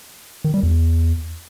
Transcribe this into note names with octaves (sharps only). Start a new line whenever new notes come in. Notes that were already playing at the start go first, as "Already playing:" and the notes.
D#3
G3
E2